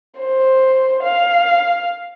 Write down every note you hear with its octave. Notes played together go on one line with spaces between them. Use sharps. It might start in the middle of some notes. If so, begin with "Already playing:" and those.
C5
F5